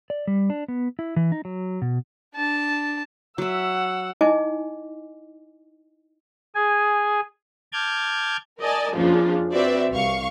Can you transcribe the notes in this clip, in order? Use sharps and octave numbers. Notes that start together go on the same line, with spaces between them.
D5
G3
D4
B3
E4
E3
D#4
F#3
B2
D4 A5
F#3 E5 F#5 E6
D#4 E4 D#5 G#5 D6
G#4 G#5
A5 D6 F6 G6 G#6
A#4 D5 D#5 G#5 A5
F2 C#3 F3 A#3 D4 F4
C4 F#4 B4 D5 E5
C2 F5 C#6